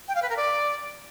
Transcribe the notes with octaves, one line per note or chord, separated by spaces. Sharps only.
G5
F5
B4
A#4
D5